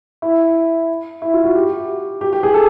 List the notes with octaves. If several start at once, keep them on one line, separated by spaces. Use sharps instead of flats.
E4
E4
F4
F#4
G4
G4
G4
G#4
A4